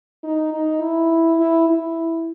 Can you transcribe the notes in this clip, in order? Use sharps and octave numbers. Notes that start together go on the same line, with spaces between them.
D#4
D#4
E4
E4
E4